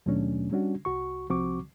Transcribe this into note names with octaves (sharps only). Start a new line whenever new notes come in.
D#2 B2 F#3 A3 C#4 D4
G3 C#4 D4 F#4
C2 F#4 C#6
C2 F3 C4 F#4 C#6 D6